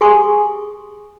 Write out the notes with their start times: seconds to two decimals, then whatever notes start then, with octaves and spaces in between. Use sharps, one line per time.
0.01 G4 G#4 G#5 C6 C#6 D#6